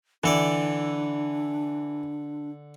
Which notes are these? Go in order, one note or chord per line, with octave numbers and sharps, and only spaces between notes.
D3 E3 D4 A4 D5